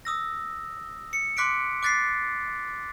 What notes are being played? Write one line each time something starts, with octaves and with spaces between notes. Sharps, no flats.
D#6 E6 A#6
C#7
C6 D6 F#6 B6 C#7 D7
D6 F#6 A6 B6 C7